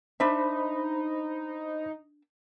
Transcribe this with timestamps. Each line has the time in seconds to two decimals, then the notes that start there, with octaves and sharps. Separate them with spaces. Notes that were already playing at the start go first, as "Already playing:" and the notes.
0.20 D4 D#4 C5 E5 B5